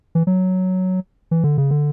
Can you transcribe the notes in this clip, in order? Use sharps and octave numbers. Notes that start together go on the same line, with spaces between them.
E3
F#3
E3
D3
C#3
D3